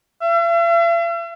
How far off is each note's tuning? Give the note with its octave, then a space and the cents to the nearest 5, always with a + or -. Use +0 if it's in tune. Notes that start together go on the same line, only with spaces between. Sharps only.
E5 +45